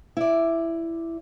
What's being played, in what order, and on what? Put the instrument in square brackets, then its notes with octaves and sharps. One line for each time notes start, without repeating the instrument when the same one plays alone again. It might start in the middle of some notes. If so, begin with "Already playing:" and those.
[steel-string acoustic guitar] E4 D5